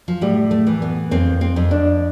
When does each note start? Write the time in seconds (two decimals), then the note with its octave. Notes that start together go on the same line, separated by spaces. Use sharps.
0.08 F3
0.21 A2 G3
0.51 A3
0.67 E3
0.82 B3
1.11 F2 C4
1.41 C4
1.56 F2
1.71 D4